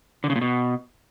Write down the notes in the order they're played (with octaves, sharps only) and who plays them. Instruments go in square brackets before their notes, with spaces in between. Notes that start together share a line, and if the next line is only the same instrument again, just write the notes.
[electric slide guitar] D3
C#3
A#2
B2